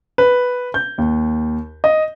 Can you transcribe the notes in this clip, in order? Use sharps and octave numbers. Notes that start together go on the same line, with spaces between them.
B4
G6
D#2
D#5